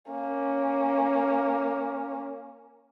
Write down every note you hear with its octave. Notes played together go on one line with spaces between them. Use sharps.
A#3 C#4